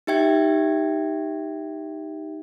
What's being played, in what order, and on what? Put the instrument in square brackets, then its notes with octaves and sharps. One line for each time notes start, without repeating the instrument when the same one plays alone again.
[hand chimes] D#4 G4 E5 G5 G#6